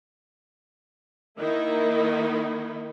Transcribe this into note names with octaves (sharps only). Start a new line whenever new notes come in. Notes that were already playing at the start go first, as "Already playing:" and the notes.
D#3 A#3 D#4 E4